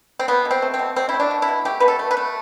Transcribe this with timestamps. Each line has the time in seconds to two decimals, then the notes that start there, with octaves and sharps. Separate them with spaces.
0.19 C4
0.28 A3 B3
0.45 B2
0.51 C4
0.62 A3
0.74 C4
0.79 B2
0.96 B2 C4
1.09 E4
1.14 A3
1.20 D4
1.31 B2
1.42 E4
1.48 B2
1.65 A3 G4
1.80 B2 B4
1.88 A4
1.99 A3
2.11 B4
2.17 A3